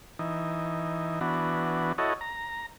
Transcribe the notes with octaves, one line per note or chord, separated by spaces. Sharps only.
E3 D#4
E3 B3 D4 F#4
E4 F#4 A4 C#5 D#5
A#5